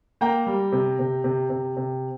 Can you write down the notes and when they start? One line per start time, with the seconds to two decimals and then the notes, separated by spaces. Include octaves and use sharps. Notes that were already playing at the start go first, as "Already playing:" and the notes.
0.21 A#3 G5 A#5
0.47 G3
0.72 C3
0.99 C3
1.24 C3
1.50 C3
1.77 C3